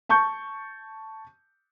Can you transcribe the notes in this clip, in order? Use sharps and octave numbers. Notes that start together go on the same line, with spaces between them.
A5 C#6 G6